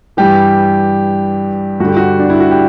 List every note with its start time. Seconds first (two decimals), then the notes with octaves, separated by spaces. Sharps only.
0.17 G2 E3 G4
1.80 G2 F#4
1.84 D3 G4
1.96 F#4
2.19 D4
2.29 E4
2.40 F#4
2.51 G4